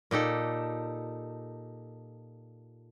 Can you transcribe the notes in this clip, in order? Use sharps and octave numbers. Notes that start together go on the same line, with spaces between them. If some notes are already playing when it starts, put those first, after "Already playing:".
A#2 D#4 G4 A4